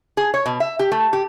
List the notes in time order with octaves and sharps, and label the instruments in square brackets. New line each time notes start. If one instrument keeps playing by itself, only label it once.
[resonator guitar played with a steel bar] G#4
C#5
B2
E5
G4
A3
G4